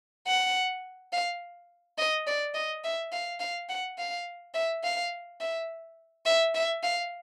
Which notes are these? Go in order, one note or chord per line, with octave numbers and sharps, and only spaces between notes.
F#5
F5
D#5
D5
D#5
E5
F5
F5
F#5
F5
E5
F5
E5
E5
E5
F5